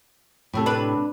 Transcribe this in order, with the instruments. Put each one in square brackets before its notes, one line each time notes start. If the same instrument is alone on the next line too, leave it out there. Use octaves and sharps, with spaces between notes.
[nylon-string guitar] A2 C3 A4
[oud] D4 B4